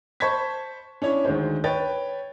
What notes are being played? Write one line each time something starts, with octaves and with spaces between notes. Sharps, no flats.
C5 A5 B5 C#6 G#6 B6
C#4 D4 E4 C#5
D2 D#3 G#3 C5
B4 C#5 G5 A6